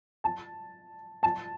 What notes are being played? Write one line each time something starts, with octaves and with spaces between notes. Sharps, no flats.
A5
A5